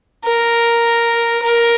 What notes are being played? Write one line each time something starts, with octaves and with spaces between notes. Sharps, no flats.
A#4
A#4